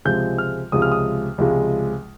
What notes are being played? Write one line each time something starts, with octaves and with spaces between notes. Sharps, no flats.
C#2 C3 F3 G#3 G6
F6
C#2 C3 F3 G#3 D#6
F6
D#6
C#2 C3 F3 G#3